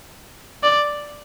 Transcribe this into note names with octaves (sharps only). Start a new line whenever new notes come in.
D5